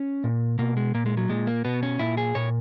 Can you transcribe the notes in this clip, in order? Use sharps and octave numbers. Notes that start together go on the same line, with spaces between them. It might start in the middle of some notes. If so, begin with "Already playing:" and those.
Already playing: C#4
A#2
B2 A#3
G#3
A#2 A#3
G#3
F#3
A#2 G#3
A#3
B2 B3
C#4
A#2 E4
G#4
A#2 C#5